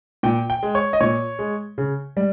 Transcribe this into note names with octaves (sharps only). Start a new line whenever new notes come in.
A#2 G5
G5
G#3
C#5
D#5
A#2 C#5
G#3
C#3
G3